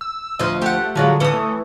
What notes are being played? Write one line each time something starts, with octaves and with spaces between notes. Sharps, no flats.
E6
D2 F3 D#5
A3 G4 F#5
D3 F3 F#3 G#3
E3 C#4 A4 D#6
A3